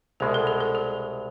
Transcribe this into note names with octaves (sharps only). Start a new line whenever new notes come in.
C2 B2 G#3 G#4
A4
G#4
A4
G#4